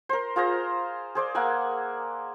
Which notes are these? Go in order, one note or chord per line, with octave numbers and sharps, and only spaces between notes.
A#4 C5
F4 G#4 C5 A#5
G#4 C5 D5
A#3 F#5 G#5 E6